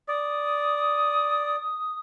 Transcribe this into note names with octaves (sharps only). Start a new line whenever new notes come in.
D5 D#6